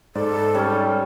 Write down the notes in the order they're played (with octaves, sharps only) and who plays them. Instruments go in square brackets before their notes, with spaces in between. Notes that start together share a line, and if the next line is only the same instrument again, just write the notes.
[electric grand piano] G#2 [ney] A4 [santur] D5
[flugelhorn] G3 [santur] C#4